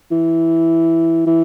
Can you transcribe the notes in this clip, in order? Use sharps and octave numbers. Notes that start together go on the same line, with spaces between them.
E3
E3